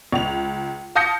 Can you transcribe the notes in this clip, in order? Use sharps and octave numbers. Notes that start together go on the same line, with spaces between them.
C#2 F7
F5 A5 D#6 G6 A#6 C#7